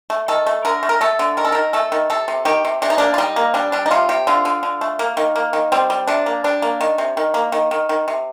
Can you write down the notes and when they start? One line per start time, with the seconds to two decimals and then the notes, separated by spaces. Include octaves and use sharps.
0.10 A3
0.28 D#3 A4
0.46 A3
0.65 D3 A#4
0.83 A3
0.89 A#4
1.01 A3 A4
1.19 D3
1.37 D#3 A#4
1.45 A4
1.52 D#3 A#4
1.73 A3 A4
1.92 D#3
2.10 C3 A4
2.28 C3
2.45 D#3 G4
2.65 C3
2.82 C3 D4
2.90 D#4
2.98 A#3 D4
3.14 F4
3.18 G3 D#4
3.36 A#3
3.54 G3 D4
3.72 G3 D4
3.86 D#4
3.91 C3 F4
4.09 C3 G4
4.27 D3 F4
4.45 D3
4.63 D3
4.81 A3
4.99 A#3
5.17 D#3
5.36 A#3
5.53 D#3
5.72 G3 C4
5.90 G3
6.07 C3 D4
6.26 A#3
6.44 G3 D4
6.62 A#3
6.81 D#3
6.98 C3
7.17 D#3
7.34 A#3
7.52 D#3
7.71 D#3
7.89 D#3
8.08 C3